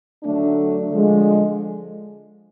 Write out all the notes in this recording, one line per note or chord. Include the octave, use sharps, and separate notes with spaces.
D3 F#3 A3 D4
D3 F3 G#3